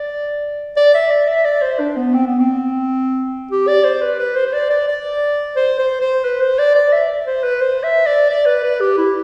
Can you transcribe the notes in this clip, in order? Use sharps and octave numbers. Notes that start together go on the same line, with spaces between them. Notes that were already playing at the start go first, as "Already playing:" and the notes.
Already playing: D5
D5
E5
D5
E5
D5
C5
D4
B3
C4
B3
C4
G4
D5
C5
B4
B4
C5
C5
D5
D5
D5
C5
C5
C5
B4
C5
D5
D5
E5
C5
B4
C5
E5
D5
D5
B4
B4
G4
E4